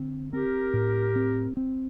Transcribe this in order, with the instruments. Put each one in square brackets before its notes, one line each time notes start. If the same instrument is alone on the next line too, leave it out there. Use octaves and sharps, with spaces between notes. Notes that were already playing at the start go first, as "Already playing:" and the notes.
Already playing: [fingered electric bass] D3 C4
[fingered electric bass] C4 [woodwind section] G4 A#4
[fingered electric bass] A2
C4
C4